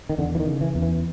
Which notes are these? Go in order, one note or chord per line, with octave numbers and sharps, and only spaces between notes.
D#3
E2 D3
E3
D#3
C#3
E3
E2
E3